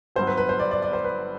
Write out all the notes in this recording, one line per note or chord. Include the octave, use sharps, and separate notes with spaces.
G1 G2 F#3 C5
B4
B4
C5
D5
D5
D5
C5
B4